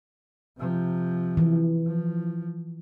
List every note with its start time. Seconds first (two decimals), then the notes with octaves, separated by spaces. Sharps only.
0.58 C3 F3
1.37 E3
1.86 F3